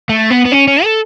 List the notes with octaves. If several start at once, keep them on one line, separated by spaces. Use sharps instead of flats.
A3
B3
B3
C#4
C#4
A4